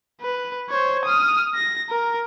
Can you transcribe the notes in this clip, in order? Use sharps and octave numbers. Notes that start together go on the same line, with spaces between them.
B4
C5 C#5
D#6 F6
A#6
A#4